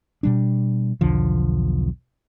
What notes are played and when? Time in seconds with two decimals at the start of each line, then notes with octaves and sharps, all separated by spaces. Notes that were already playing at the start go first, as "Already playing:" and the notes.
0.23 B2 G3 D4
1.01 B1 E2 D3 F3